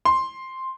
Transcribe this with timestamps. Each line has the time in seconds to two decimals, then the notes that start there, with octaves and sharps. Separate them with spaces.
0.05 C6